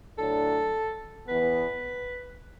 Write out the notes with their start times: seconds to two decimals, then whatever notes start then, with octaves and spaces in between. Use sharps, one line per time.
0.18 A2 F#3 D4 A4
1.28 E2 E3 B3 B4